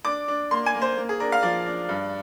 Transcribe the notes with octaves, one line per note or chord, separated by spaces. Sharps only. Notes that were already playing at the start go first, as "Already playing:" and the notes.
D4 D6
D4
A#3 C6
G#5
A#3
C5
A#3
G#4
D4 A#4
F5
F3 D5
D4
G2